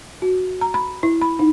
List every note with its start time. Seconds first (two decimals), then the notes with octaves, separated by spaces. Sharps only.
0.22 F#4
0.61 A#5
0.74 B5
1.03 E4
1.22 B5
1.39 D#4